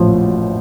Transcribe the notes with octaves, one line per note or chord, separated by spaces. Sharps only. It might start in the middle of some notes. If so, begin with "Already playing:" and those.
Already playing: A1 A2 F3